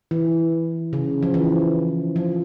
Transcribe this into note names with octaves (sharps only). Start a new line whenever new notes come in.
E3
C#3
F3
E3
F3